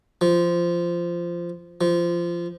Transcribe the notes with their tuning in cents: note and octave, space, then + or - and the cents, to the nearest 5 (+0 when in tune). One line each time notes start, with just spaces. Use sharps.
F3 -15
F3 -20